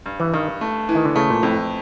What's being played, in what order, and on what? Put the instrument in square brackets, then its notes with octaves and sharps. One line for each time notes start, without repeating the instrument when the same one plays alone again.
[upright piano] G2
[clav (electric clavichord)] E3
[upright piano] G2 [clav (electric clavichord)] D#3
[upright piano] A3
E3
[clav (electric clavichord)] D#3
D3
[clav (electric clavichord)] C#3 [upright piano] A3
[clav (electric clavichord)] A#2
[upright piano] F2 [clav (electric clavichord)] A2